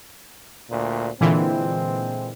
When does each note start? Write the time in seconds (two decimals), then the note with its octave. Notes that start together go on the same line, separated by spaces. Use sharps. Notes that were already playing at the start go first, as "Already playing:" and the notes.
0.71 D2 A#2
1.21 A#2 D3 E3 G#3 C4